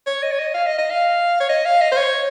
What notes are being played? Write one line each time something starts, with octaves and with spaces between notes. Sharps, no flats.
C#5
D#5
C#5
D#5
F5
D#5
D#5
F5
C#5
D#5
F5
D#5
C5
C#5